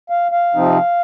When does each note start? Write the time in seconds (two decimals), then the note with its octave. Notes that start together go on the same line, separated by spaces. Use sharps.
0.10 F5
0.32 F5
0.54 C3 F3 C4 D#4